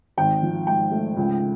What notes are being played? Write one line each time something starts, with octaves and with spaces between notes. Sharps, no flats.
G#1 G5
F3
G#2 G5
A3
C#2